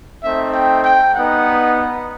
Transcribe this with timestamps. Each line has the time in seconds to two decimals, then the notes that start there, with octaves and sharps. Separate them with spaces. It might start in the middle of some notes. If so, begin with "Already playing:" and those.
0.24 A3 C4 D#4 E5
0.54 G5
0.84 G5
1.15 G3 B3 D#4 F#5